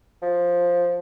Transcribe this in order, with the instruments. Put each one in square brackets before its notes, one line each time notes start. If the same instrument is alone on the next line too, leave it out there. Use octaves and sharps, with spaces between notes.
[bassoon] F3